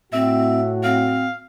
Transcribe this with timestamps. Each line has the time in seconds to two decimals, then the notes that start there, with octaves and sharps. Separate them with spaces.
0.13 A2 C4 F#4 E5
0.84 C4 F5